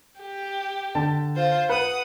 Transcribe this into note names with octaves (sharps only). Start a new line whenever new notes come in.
G4
D3 A5
F4 C5
B4 F#5 D#6